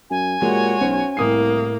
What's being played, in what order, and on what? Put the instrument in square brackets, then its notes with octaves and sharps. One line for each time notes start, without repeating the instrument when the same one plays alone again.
[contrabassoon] F#2 [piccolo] G#5
[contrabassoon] A#2 [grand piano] G#3 G4 [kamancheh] F#4 C#5
[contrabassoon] B1 [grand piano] C#4 C5
[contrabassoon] C2 [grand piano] A2 D#6 C7 [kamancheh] A#3